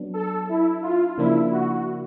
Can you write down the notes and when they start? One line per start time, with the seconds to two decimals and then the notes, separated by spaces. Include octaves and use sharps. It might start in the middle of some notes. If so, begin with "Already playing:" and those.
Already playing: F#3 B3 D4
0.14 A4
0.49 E4
0.83 F4
1.18 C#3 F3 A#3 D4 E4
1.51 F#4